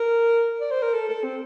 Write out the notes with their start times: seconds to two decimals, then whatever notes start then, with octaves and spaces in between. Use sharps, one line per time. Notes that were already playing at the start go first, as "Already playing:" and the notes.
Already playing: A#4
0.61 D5
0.71 C5
0.83 A#4
0.94 A4
1.09 A4
1.24 C4